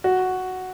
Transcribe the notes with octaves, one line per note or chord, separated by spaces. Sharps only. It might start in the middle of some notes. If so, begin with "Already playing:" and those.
F#4